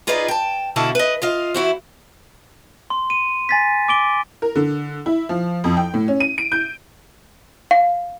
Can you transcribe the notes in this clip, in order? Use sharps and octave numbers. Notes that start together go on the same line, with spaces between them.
D#4 F4 G#4 B4 D5 D#5
G5 A5
B2 D3 E4 A4 F5 A5
B4 D#5
F4 D#5 F5
E3 E4 F#4 C5
C6
D#7
G#5 A6 B6
D6 D7 G7
A#4
D3
E4
F3
F2
G5
A2
C#4
D#7
D7
G6
F5